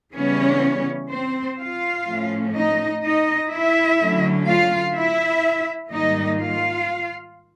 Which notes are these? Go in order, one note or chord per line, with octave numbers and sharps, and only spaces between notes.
C#3 E3 G3 B3 C#4 C#5
C4 C5
F4 F5
A2 F3 A3 C#4
D#4 D#5
D#4 D#5
E4 E5
D3 F#3 A3 C#4
F4 F5
E4 E5
G#2 D#3 G3 A#3 D#4 D#5
F4 F5